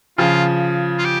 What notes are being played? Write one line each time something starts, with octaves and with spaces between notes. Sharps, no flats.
C#3 F3 F4
F4
G4